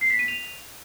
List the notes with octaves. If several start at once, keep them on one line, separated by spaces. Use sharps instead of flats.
C7
B6
D#7
F7